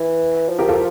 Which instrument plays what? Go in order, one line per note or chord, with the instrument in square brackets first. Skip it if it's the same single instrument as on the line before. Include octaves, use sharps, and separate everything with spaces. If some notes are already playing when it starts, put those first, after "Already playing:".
Already playing: [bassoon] E3
F3
[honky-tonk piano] G4 A#4
F4 A4